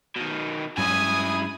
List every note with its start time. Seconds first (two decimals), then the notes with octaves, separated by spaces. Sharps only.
0.16 B2 D#3
0.78 G2 C#3 F#3 G#3 E4 G#5 D#6